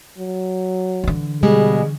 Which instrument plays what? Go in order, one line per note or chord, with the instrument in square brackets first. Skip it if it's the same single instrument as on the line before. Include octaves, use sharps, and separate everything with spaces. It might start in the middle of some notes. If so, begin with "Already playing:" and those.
[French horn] F#3
[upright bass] D3 E3
[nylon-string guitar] B2 G3 G#3 [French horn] G#4